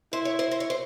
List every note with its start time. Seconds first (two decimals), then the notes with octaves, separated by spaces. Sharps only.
0.13 E4 C5
0.25 C#5
0.39 C5
0.51 C5
0.60 C#5
0.70 C5